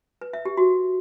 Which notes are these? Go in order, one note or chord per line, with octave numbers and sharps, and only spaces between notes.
B4
E5
G4
F#4